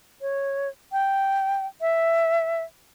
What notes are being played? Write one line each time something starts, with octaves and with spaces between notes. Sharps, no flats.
C#5
G5
E5